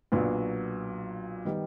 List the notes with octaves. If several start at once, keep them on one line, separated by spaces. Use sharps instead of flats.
B1 A#2 F#3 B3 D4
D#3 G3 B3